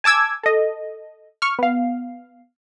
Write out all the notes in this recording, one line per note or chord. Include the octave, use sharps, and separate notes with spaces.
G#5 A5 D6 E6 G#6
A4 D#5
C#6 F6
B3 F5